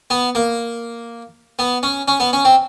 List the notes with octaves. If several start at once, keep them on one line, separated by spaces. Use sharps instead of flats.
B3
A#3
B3
C#4
C#4
B3
C#4
C4